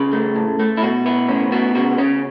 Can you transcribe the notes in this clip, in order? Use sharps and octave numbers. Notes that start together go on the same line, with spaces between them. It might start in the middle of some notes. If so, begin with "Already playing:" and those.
Already playing: C#3 B4
A3
A2
A3
E4
B2 F#4
B3 E4
A2 C#4
B3 F#4
C#3 F#4
C#3 C#4